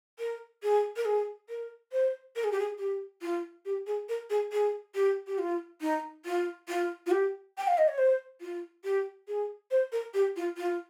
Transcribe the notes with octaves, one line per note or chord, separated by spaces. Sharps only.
A#4
G#4
A#4
G#4
A#4
C5
A#4
G#4
G4
G#4
G4
F4
G4
G#4
A#4
G#4
G#4
G4
G4
F4
D#4
F4
F4
F4
G4
G5
F5
D#5
C#5
C5
F4
G4
G#4
C5
A#4
G4
F4
F4